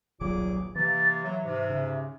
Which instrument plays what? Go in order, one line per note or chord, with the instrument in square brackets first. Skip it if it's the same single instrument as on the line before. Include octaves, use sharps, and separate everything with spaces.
[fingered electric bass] D#1 B1 F#3 [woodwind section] A#2 G#4 D6
[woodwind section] C3 A#3 [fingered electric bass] E3 [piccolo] A6
[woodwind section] F#3 [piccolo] E5
[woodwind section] G#2 C3
[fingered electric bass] C#3